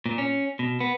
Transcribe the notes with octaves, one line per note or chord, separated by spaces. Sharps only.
A#2
C#4
B2
B3